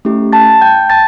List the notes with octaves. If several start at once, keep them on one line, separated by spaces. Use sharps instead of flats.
A3 C#4 E4 G4
A5 A6
G5 G6
A5 A6